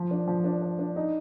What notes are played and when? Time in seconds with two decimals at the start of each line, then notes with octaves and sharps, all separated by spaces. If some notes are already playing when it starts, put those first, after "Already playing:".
Already playing: F3
0.11 D4
0.27 F3
0.44 D4
0.62 D4
0.79 D4
0.96 D#4